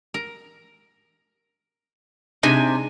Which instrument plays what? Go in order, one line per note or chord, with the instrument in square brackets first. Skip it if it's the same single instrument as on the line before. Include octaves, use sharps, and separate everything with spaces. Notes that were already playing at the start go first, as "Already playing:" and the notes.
[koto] A#4
[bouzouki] C3 G#5 [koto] G#3 D4 D#4